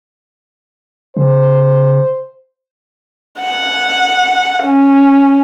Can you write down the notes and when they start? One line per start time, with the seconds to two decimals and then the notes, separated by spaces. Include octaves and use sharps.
1.17 C#3 C5
3.40 F#5
4.64 C#4